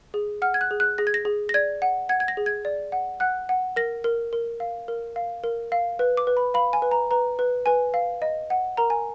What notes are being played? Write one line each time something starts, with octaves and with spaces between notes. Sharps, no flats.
G#4
F#5 F6
G#6
F#6
G#4
F#6
G#4 A#6
G#6
A#6
G#4
A#6
D5 G#6
F#5
F#5 G#6
G#6
A#6
G#4
G#6
D5
F#5
F#5 F#6
F#5
A#4 A#6
A#4
A#4
F5
A#4
F5
A#4
F5
B4
D6
B4
B5
F5 B5
G#5
B4
A#5
B4 A#5
B4
B4 G#5
F5
D#5
F#5
A#4 A#5
G#5